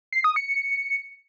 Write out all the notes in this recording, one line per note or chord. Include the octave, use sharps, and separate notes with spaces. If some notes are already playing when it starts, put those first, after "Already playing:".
C7
D#6
C#7